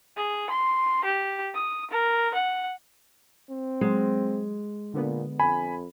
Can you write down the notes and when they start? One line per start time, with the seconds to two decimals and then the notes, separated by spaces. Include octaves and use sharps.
0.17 G#4
0.50 C6
1.05 G4
1.55 D#6
1.91 A#4
2.34 F#5
3.50 C4
3.81 F#3 G#3
4.94 A#2 D3 B3
5.39 F2 G#5 B5